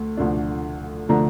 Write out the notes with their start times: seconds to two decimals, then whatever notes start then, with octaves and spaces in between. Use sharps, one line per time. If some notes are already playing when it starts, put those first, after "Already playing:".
Already playing: D2 A3
0.17 D2 D3 F3 A3 D4
1.09 D3 F3 A3 D4 A#5